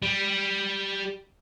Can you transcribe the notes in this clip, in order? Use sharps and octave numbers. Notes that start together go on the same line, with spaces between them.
G3